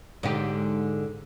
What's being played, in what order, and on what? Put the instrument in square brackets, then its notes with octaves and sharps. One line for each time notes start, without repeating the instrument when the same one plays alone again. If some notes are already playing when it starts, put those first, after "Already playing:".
[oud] G#2 D3 G4